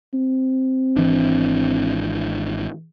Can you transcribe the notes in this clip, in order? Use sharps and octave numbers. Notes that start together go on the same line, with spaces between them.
C4
G#1 E3 D4